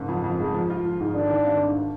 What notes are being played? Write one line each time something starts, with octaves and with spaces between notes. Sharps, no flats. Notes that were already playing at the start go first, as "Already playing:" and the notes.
Already playing: F#1 G#2
F2
F2
G#3
F3
F4
F3
G#2
D#3 D4
D#3
G#1
D#3
D4